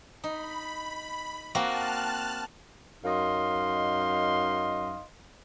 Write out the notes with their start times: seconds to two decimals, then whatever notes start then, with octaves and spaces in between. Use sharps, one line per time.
0.24 D#4 B5
1.55 A#3 C4 F#4 A5 F6 F#6
3.05 F#2 D#4 D#5 F5 C6